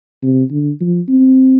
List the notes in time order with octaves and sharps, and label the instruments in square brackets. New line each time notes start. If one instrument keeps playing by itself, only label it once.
[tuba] C3
D3
F3
C4